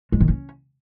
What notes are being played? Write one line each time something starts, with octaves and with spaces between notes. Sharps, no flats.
G#3
D#3
C#4